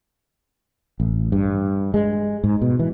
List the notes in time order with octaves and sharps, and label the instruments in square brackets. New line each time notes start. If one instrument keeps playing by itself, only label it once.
[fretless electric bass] A1
G2
G#3
G#2
B2
E3